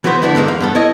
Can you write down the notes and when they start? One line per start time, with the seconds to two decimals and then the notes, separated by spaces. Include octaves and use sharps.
0.04 E3 B3 F#4 G#4 B4 C5
0.22 F2 D3 A3 B3 D4 E4
0.35 G2 D3 G#3 A#3 D#4
0.48 E2 F5
0.60 G2 B3 A4
0.75 E4 A4 C#5 D#5